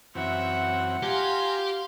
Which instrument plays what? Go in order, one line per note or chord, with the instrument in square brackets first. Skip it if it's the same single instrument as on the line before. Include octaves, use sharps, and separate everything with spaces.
[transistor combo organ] F#2 E3 C4 [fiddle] E5 [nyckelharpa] F#5
[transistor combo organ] F4 G#5 A#5 [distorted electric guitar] G4 [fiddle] F5 C6